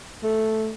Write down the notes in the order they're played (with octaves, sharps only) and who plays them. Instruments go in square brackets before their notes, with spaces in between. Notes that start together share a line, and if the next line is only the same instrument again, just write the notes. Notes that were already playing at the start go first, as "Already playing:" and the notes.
[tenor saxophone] A3